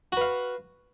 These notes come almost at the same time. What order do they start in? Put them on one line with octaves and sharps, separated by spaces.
F#4 B4 F5